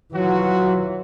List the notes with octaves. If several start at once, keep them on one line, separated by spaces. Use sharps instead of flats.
E3 F#3 F4 F#4